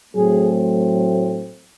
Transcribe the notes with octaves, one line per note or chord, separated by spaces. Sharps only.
A2 F#3 A3 C4 G#4